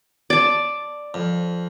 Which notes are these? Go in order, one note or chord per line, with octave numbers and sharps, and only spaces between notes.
D5 A5
F2